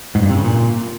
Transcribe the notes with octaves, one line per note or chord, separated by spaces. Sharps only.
G#2
G2
C3
C#3
A#2